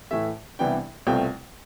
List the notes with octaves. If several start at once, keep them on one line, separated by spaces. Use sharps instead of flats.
A2 E3 A3 E5
C2 C3 E3 B3 D4 G5
C2 B2 A3 C4 F4 G5